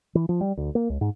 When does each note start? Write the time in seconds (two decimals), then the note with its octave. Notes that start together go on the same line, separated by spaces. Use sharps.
0.15 E3
0.29 F3
0.41 G3
0.57 D2
0.75 A#3
0.90 C#2
1.01 G#2